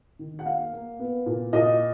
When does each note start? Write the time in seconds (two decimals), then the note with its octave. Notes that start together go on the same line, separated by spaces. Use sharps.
0.19 D#3
0.39 F#5
0.45 A#3 F5
0.73 A#3
0.99 B3
1.26 A#2
1.53 A#2 D#5